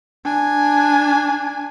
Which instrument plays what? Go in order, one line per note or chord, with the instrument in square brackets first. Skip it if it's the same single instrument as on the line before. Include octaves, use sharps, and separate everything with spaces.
[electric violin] D4 G#5